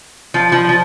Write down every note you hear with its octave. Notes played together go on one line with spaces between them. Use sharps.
F3
F3
F3